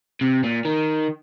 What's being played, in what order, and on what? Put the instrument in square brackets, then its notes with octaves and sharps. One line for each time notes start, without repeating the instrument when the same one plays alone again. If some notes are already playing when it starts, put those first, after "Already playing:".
[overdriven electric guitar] C3
A#2
D#3